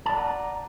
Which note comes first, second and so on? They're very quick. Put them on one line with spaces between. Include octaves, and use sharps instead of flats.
A5 D5 F#5 A#5